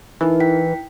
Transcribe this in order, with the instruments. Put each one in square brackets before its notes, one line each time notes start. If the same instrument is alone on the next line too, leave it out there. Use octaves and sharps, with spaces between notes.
[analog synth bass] E3 [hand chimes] D#4 A#4 B4
[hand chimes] E4 G5 B6